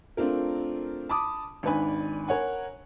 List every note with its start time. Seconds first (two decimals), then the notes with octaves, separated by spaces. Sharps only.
0.17 A3 C4 D4 F4 A#4
1.09 A5 B5 D6 D#6
1.63 G#1 D#3 D4 B4 G#5 B5
2.28 A#4 C#5 F#5 G#5